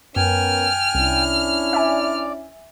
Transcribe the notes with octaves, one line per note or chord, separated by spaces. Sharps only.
F#2 B3 C#4 A#4 G5 G#5 F6
C2 C#4 D4 E4
D5 E5 G#5